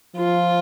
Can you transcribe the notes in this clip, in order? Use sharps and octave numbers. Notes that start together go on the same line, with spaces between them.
F3 F4